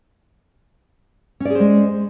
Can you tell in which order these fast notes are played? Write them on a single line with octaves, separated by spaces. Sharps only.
C#4 D5 G#4 C5 G#3